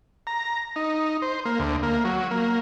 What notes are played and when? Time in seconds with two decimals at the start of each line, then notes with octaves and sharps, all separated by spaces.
0.27 A#5
0.76 D#4
1.22 C5
1.45 A#3
1.59 D2
1.83 A#3
2.05 F#3
2.31 A#3